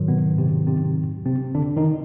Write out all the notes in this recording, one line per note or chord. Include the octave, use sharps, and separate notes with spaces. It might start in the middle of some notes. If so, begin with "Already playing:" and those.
Already playing: G#2 D#3 F#3
B2 B3
C3 C4
C3 C4
C3 C4
D3 D4
D#3 D#4